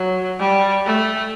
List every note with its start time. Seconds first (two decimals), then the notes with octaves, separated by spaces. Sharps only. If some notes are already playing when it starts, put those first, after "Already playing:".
Already playing: F#3
0.39 G3
0.86 A3